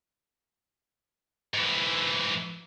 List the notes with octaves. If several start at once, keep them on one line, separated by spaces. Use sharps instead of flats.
G#2 E3